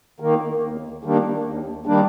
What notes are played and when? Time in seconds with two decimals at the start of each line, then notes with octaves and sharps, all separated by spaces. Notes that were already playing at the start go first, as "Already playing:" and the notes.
0.20 D#3 A#3
0.62 D#2
1.03 D#3 G3 A#3 D4
1.44 D#2
1.86 D#3 G3 A#3 D4